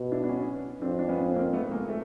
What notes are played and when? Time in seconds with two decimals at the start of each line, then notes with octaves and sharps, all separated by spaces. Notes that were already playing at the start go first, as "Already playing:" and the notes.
Already playing: B2
0.12 D4 E4
0.24 D4
0.29 B3 C#4
0.82 F2 C4 D4
0.99 D4
1.09 B3 C#4
1.36 A#3 C4
1.53 A3 B3
1.71 G#3 A#3
1.89 A3